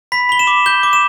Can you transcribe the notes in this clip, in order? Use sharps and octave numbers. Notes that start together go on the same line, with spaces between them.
B5 B6
B5 G7
E7
D6
G6 G7
D6
E7